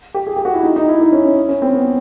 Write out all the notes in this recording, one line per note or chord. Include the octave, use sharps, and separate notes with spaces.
G4
G#4
G4
F#4
E4
D#4
D#4
E4
D#4
C#4
C#4
C#4
C4
B3